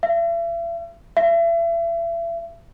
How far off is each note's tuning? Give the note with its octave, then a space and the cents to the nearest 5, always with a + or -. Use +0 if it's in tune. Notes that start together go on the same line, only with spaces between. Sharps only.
E5 +40
E5 +35